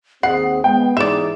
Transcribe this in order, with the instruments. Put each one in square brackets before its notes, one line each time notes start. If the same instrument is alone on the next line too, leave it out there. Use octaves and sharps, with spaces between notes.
[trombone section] D#2 C4 [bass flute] G#4 [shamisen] F#5 [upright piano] C7
[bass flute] G#3 [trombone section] B3 [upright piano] G5
[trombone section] G#2 E3 D#4 [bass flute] G#4 [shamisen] D5 E5 [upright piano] E7